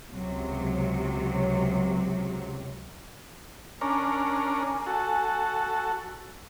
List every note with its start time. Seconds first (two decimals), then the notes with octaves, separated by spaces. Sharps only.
0.11 C#2 C3 F#3
3.81 C#4 D4 A#4 G#5
4.87 F#4 A4